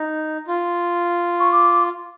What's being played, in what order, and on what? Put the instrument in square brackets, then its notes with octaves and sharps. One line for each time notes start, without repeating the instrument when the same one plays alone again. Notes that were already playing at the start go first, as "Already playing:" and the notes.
Already playing: [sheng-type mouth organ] D#4
F4
[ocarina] C#6
D6